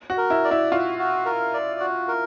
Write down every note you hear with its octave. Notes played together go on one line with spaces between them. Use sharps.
F#4
A#4
E4
D5
E4
F4 F#4
F#4
A#4
D5
F#4
A#4